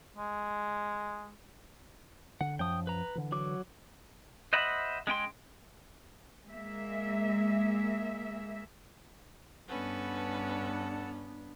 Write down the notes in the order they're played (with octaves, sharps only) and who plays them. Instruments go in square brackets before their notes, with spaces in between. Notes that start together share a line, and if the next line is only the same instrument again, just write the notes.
[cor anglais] G#3
[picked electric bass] D3 [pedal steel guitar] F#5
[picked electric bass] F#2 F3 [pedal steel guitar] G5 D#6
[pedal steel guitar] B4 A#5
[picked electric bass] D3 E3
[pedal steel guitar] F#3 D6
C5 D#5 E5 F#5 B5
G#3 C#4 G5 C6
[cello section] G#3 A#3 E5
[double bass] G2 B3 [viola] C#4 B4 [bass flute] D4 [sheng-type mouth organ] A4 F#5 A5